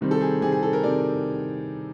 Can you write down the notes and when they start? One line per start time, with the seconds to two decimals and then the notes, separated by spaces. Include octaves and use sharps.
0.01 C3 D#3 G3 C4
0.11 A4
0.21 G#4
0.42 C3 D#3 G3 C4 G#4
0.52 G#4
0.63 A4
0.73 A#4
0.83 C3 D#3 G3 C4 D5